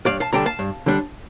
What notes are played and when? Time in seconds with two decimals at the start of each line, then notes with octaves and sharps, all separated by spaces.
0.06 G2 D5 F5
0.20 F5 A5
0.33 D3 G3 D4 G5 A#5
0.46 F5 A5
0.59 G2
0.86 D3 G3 D4